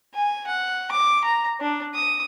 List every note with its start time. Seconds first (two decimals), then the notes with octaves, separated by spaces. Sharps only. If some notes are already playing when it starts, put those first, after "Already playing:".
0.15 G#5
0.47 F#5
0.92 D6
1.24 A#5
1.60 D4
1.95 D#6